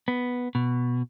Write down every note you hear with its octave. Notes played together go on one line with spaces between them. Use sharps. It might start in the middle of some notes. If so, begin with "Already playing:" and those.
B3
B2